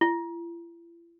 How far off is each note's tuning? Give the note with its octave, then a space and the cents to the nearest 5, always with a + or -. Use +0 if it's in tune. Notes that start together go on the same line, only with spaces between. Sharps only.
E4 +45